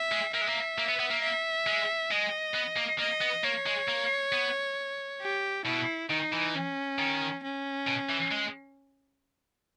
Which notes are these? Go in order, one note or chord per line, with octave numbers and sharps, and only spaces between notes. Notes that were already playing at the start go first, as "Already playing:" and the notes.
Already playing: E5
G#3
A#3 E5
G#3
A#3
A#3
B3
B3
A#3
E5
G#3
G#3 D#5
B3
A#3
A#3 D#5
B3
A#3 C#5
G#3
A#3
B3
G4
B2 E4
D#3 D#4
E3
C#4
D#3
C#4
B2
E3
G#3